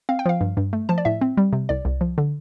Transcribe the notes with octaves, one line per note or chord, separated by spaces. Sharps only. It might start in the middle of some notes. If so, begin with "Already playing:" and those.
C4 F5
G5
F3 F5
G2
G2
A3
F3 A5
D5
A2 E5
C4
G3
C3
C2 D5
C2
F3
D3